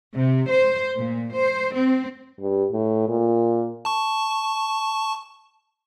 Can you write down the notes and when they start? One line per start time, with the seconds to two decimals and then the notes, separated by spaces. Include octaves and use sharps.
0.14 C3
0.49 C5
0.96 A#2
1.34 C5
1.75 C4
2.40 G2
2.72 A2
3.08 A#2
3.85 A5 C#6